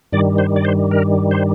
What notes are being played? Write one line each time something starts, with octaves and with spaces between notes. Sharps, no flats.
G2 D#3 G3 D5
C5
D5
C5
A#4
C5